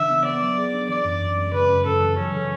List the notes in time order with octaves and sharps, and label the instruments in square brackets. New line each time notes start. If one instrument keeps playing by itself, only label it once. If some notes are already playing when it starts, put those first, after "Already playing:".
Already playing: [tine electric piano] C#3 E3 D4 [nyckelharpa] E5
[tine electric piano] B3
[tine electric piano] B3 [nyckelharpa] D5
[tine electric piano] F#3
G#4
D4
[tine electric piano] E3 [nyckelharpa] D5
[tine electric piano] F#2
F#2
G#3
[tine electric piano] C#3 [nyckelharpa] B4
[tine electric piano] F#2
[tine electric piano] F#2 [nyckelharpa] A4
[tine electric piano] E3
[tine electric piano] F#3 [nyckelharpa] C#4
[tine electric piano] C#3